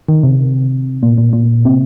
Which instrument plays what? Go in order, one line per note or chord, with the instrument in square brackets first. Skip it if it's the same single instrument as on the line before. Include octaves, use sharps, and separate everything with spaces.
[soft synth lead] D#3
C3
A#2
A#2
A#2
C3